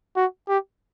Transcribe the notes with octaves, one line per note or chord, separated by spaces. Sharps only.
F#4
G4